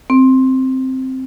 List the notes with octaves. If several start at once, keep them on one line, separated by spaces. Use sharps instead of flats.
C4